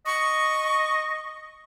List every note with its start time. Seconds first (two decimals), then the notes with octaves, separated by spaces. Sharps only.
0.06 D#5 C#6